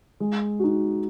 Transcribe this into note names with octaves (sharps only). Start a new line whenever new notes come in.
G#3
D#4 F#4